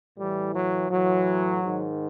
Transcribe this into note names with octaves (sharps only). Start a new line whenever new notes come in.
A2 E3 G3
F#3
A2 E3 F#3
G#2 D#3